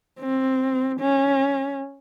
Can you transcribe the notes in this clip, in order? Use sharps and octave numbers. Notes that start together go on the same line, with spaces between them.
C4
C#4